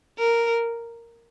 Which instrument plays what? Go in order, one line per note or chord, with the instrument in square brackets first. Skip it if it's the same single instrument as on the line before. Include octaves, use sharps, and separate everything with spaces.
[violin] A#4